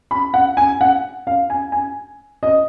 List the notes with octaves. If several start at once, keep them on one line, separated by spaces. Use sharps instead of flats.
B5
F#5
G#5
F#5
F5
G#5
G#5
D#5